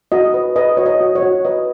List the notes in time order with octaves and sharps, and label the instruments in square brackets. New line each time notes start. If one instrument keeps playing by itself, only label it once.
[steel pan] F#4 D#5
B4
B4 D#5
F#4 C#5
D#5
F#4
C#5
F#4
B4 D#5